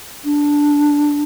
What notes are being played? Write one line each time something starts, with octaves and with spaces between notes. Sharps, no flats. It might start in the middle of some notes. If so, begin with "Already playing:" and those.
D4